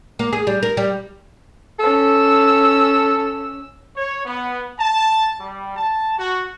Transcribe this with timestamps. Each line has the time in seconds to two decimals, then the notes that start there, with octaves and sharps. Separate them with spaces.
0.19 A#3
0.33 G#4
0.47 G3
0.63 A#4
0.77 G3
1.79 C#4 A4 E6
3.97 C#5
4.26 B3
4.79 A5
5.40 G3
5.77 A5
6.18 F#4